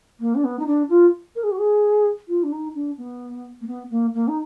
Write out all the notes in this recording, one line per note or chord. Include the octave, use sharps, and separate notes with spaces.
A#3
D4
B3
D#4
D4
F4
A#4
G#4
F#4
G#4
F4
D4
D#4
D4
B3
A#3
B3
A#3
A#3
D#4